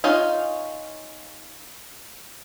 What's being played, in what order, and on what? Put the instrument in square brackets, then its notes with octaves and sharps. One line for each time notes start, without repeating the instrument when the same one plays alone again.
[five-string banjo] C#4 D#4 F4